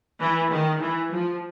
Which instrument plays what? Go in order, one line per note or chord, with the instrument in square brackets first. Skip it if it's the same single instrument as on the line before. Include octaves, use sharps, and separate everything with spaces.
[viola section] E3
D#3
E3
F3